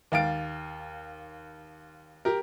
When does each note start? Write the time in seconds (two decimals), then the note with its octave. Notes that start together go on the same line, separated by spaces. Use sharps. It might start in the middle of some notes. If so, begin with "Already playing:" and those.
0.12 D#2 F5 A6 D7
2.25 G4 A#4